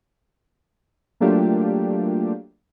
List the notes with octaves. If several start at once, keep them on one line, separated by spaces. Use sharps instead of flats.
F#3 A3 A#3 D4 F4 G4